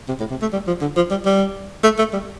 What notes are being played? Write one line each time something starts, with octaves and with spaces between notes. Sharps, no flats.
C3
A2
C3
A3
G3
F3
D3
F3
G3
G3
A3
A3
G3